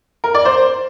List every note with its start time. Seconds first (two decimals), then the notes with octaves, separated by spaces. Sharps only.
0.24 A#4
0.35 D5
0.45 C5